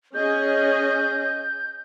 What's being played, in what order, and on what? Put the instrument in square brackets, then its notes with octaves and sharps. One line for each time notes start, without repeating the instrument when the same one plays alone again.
[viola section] C#4 G#4 D#5 [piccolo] G6